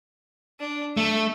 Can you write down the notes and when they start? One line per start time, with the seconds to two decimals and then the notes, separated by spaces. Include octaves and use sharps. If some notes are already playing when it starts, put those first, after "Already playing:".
0.60 D4
0.97 A3 E6